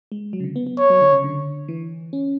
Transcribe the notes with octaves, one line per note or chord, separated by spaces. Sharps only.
G#3
F#3
C#3
D3
B3
B3
C#5
F#3
D3
C#3
D3
E3
C#4